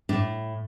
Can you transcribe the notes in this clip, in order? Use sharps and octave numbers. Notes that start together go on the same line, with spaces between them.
A2 D4